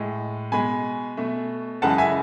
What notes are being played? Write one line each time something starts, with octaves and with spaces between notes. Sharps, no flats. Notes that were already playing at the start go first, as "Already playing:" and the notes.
Already playing: A2 G#3
B2 G#3 G#5 B5
B2 A3
F#2 C#3 E3 G#3 F#5 A5
E5 G#5